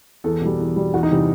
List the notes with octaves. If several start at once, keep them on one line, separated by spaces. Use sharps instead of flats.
E2 A4
B2 G3
E2
B2 G3
E2 F#4
D#4
C3 E3 G3 C4